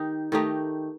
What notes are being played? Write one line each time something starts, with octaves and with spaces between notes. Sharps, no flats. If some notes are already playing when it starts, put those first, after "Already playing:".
Already playing: D#3 D#4 G4
D#3 A3 D#4 G4